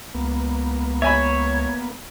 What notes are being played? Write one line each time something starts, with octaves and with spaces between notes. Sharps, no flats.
C#2 A#3 B3
C#5 E5 G#5 B5